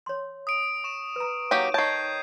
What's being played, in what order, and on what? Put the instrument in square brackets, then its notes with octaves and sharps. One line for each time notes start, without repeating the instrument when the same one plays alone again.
[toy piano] C#5 C6
[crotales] D#6 D7
C#6 E7
[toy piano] B4 A#5
[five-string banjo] F#3 A#3 G4 [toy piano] D#4 C#5 [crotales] D#7
[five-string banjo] D#3 A5 [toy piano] C#5 C#6 [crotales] G6 G#6 C7